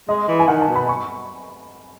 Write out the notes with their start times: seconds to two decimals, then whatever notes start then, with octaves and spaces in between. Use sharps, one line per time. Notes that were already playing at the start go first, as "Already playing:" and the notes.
0.09 G#3 D#5
0.28 E3
0.39 G#5
0.48 D#3 F#5
0.61 A5
0.68 B2
0.76 B5
0.89 C#6